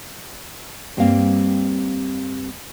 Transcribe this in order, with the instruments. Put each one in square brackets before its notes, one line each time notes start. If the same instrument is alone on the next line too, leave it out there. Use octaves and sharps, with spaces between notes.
[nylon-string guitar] G2 G3 A#3 C4 F5